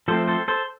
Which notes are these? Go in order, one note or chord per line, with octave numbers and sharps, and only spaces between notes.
F3 A3 C4 A4 C5
A4 C5
A4 C5